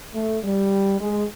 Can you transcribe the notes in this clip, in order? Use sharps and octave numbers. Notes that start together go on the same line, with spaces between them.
A3
G3
G#3